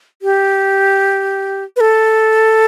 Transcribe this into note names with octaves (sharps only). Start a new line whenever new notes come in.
G4
B4
A4